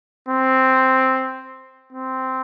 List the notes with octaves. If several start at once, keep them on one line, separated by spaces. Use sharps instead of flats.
C4
C4